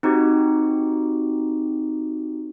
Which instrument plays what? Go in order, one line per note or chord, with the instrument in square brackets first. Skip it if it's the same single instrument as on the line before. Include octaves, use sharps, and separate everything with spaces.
[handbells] C4 D#4 F#4 G4